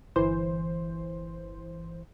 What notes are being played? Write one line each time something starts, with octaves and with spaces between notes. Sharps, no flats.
G1 E3 C5